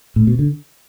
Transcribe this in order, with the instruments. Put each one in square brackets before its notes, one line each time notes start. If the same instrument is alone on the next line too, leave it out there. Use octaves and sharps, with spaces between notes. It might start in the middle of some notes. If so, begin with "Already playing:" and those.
[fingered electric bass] A2
B2
D3